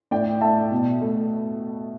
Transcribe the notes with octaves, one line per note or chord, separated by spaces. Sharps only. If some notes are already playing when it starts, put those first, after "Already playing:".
A2 D5 G5
A3 E5 A5
B2
A3